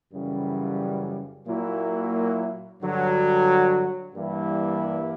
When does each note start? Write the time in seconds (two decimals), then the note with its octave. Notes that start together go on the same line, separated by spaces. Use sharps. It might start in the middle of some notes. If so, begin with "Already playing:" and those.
0.13 F#2 C#3 E3 G3
1.47 A#2 F#3 A#3 E4
2.81 G2 D3 F#3
4.15 G2 E3 G3 A#3 E4